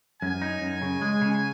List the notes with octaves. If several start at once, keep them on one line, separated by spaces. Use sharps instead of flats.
F#2 G#5
D#4
F#2
C#3
G#3
C#3